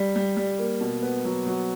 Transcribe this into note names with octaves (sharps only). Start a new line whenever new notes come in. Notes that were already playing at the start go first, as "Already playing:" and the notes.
Already playing: G3
G3
G3
A#3
B2
B3
F#3
F#3